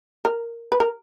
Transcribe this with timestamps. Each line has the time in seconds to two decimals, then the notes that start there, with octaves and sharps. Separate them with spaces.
0.25 A#4
0.72 B4
0.80 A#4